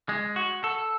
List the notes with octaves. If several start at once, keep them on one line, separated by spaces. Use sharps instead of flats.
G#3
F#4
A4